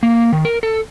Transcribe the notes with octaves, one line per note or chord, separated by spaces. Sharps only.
A#3
D#3
A#4
A4